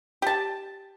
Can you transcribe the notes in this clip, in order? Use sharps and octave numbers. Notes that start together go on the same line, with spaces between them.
G4 A5